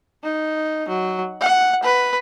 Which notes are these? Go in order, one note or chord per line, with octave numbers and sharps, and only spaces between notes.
D#4
F#3
F#5
B4